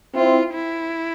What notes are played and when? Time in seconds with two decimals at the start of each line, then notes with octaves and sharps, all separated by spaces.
0.15 C4 E4 F4
0.54 E4